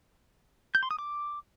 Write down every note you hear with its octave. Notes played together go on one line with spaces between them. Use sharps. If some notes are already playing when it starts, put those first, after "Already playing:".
G6
C6
D#6
D6